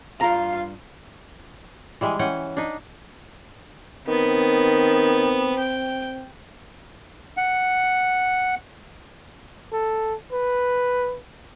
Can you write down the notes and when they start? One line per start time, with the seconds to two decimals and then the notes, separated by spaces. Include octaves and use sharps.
0.21 G2 F4 F5 A#5
2.01 E3 G3 G#3
2.19 E3 C#4 F#5 G5
2.57 D4 D#4
4.08 D#3 B3 C4
5.58 G5
7.37 F#5
9.72 A4
10.32 B4